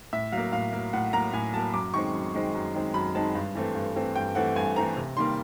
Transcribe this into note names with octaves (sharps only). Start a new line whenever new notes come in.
A2 E5
F#3 A#3 F5
A2 F5
F#3 A#3
A2 F#5
F#3 A#3 A#5
A2 G#5
F#3 A#3 A5
F#2 D6
D#3 G#3 C4 C#6
F#2
D#3 G#3 C4
F#2
D#3 G#3 C4
F#2 B5
D#3 G#3 C4 A5
G2
E3 A3 C4
G2
E3 A3 C4
G2 G5
E3 A3 C4 F#5
G2 G#5
E3 A3 C4 A#5
C3
D#3 G3 A#3 C6